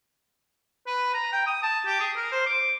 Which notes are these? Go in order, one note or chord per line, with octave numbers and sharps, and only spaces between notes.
B4
A#5
G5
D#6
A5
G4
G#4
A#4
C5
D6